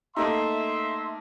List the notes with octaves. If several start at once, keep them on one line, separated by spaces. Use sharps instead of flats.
A3 A#3 D#4 E5 C6